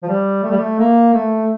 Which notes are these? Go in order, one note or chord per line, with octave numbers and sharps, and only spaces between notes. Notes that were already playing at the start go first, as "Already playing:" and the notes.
F3
G3
A3
G3
A3
A#3
A3